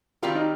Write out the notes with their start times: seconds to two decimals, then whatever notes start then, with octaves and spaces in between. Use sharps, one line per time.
0.22 D#3 G3 C4 F4 G4 A#4
0.35 D#4